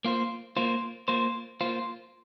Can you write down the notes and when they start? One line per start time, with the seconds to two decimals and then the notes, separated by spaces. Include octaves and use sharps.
0.05 A#3 F4 C5
0.57 A#3 F4 C5
1.08 A#3 F4 C5
1.61 A#3 F4 C5